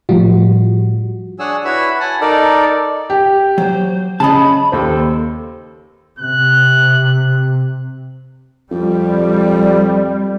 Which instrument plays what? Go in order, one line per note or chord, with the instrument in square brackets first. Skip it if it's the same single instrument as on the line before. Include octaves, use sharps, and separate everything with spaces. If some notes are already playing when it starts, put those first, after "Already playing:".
[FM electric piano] A2 F3 G3 F4 F#4
[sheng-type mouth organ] D4 G#4 C#5 F#5 G#5 E6
E4 F#4 B4 C#5 B5 E6
F#5 G#5 A5
D#4 A4 A#4 D5
[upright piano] G4
[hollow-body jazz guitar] F#3 [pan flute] C5
[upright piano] C#3 [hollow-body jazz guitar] D#5 A5 [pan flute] B5
[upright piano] D#2 C5 [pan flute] A4
[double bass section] C3 [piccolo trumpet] F#6
[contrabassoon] F2 [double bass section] G3